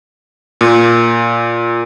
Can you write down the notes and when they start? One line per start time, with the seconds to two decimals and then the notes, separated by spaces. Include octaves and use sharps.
0.61 A#2